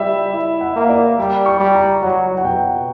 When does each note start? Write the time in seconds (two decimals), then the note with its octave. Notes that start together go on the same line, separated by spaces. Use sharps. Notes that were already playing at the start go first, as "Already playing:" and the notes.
Already playing: G3 E5
0.33 E4
0.61 F#5
0.76 A#3
0.89 D5
1.18 G3
1.46 C#6
1.60 G3
1.75 A#5
2.02 F#3 F#5
2.38 F#5
2.45 B2 G5